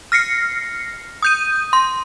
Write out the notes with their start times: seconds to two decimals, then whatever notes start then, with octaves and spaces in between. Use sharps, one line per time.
0.12 F6 A#6 C7 C#7
1.22 D#6 G6 D#7
1.73 C6